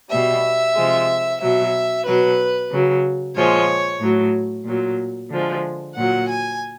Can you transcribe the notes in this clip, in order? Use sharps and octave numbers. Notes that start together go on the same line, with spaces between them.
B2 G3 E5
C3 F3 G#3
B2 F#3 E5
B2 F#3 B4
C#3 F#3
A#2 F3 G#3 C#5
A2 F#3
A#2 F#3
D3 F3 G#3
A#2 F#3 F#5
G#5